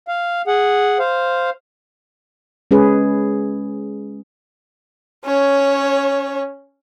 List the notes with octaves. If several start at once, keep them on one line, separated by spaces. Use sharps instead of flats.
F5
G#4 F#5
C5 F5
G#3 C#4 G#4 B4
C#4 C#5